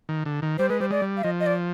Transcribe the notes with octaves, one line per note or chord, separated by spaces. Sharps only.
D#3
D3
D#3
G3 C5
G#3 B4
G3 C5
G#3 D5
G3
F5
F3 D#5
D#5
D5